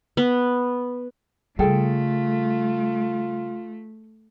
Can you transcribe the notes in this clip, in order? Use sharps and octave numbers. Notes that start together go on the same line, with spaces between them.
B3
C#3 G3 A3 F4 G#4 A4 G5